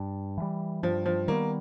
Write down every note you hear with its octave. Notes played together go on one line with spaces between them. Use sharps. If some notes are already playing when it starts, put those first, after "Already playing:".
Already playing: G2
E3 G3
G2 F3
F3
D#3 G3 A#3 B3